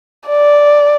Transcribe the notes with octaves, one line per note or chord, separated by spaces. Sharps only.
D5